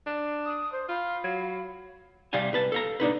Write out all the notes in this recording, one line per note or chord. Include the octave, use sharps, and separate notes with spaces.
D4
D#6
C5
F4 F5 B5
F#3
C3 G3 D5 F5 G#5
C2 B4 A5
A4 F5 A#5
A#3 D4 D#4 B4